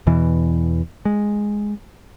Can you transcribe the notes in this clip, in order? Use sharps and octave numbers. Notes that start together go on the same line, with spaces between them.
E2 B2 E3
G#3